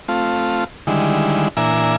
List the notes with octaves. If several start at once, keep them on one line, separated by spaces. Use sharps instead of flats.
A3 C4 F4
D3 D#3 G3 G#3 E4
A#2 E3 D4 E5 G#5 A#5